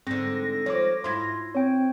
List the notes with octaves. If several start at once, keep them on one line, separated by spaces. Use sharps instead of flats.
G#2 D3 C4 A#6
F3 C#5 D6
G#2 E4 F4 C6 G#6
C4 C#5 G5